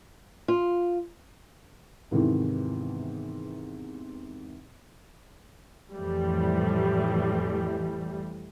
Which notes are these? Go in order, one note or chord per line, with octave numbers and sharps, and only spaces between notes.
F4
E2 G#2 C3 D#3 E3
F2 A2 E3 G3